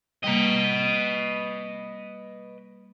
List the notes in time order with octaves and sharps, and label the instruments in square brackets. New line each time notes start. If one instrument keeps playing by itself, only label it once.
[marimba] G3 A#3 [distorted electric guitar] B4 D#5